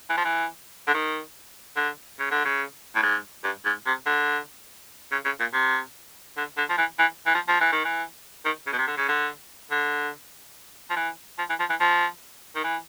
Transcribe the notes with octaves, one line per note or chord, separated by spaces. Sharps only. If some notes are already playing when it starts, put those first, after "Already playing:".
E3
F3
E3
D3
D#3
D3
C#3
D3
C#3
A2
G#2
G2
G#2
C3
D3
C#3
C#3
A#2
C3
D3
D3
F3
E3
E3
E3
F3
F3
E3
D#3
E3
D#3
C#3
B2
C3
D3
C#3
D3
D3
F3
E3
F3
E3
F3
E3
F3
D#3
E3